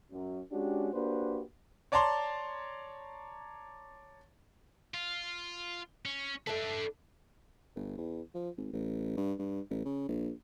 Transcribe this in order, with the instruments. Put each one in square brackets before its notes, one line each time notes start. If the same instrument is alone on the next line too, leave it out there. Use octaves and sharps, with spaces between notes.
[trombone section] F#2
G#3 C#4 D4 F#4 G4
A#3 D4 F#4 G4 B4 C5
[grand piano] C#5 D5 A5 A#5 C6
[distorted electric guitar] F4
C#4
[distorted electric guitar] D4 B4 [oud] A4 E5
[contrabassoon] G1
E2
F3
G#1
A1
G2
G2
A1
C#3
A#1